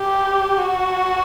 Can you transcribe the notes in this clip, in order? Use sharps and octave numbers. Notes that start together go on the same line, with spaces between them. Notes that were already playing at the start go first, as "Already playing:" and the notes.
Already playing: G4
F#4